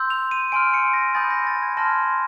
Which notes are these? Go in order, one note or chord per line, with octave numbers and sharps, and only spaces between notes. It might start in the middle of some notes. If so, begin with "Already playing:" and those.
Already playing: C6 E6 G6
F7
D#7
G#5 C6 F6 D7
C#7
A#6
G#5 B5 D#6 G6 A6
A#6
A6
G#6
A5 C6 F6 A#6